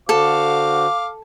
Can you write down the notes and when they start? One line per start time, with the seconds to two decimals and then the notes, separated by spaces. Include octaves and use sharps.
0.09 D3 F#4 A4 C5 F5 D6